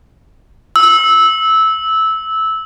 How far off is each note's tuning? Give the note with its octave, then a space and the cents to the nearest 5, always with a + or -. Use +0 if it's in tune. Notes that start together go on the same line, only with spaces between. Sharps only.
E6 -15